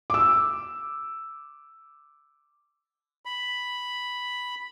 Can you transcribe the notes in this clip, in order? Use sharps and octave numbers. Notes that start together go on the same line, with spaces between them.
D6 E6
B5